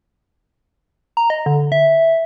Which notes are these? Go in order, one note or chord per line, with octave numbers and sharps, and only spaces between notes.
A#5
D#5
D3
E5